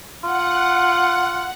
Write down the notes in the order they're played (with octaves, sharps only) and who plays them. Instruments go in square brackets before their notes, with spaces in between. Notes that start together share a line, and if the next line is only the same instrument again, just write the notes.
[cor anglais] F4 [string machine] F#5